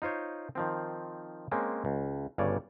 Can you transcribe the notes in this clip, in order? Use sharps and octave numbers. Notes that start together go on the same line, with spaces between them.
D#4 F4 C5 C#5
D#3 F3 C4
G#3 A#3 C4 C#4
C#2
G1 G2 C#3 C#5 D5